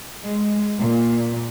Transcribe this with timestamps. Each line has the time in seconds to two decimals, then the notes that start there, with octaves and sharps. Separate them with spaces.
0.24 G#3
0.79 A#2